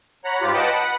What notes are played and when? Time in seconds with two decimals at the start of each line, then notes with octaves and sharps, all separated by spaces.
0.25 C#5 F#5 A#5 B5
0.41 G#2 F4 G4
0.54 B4 D#5 F#5 G5 A5 B5
0.72 F#5 B5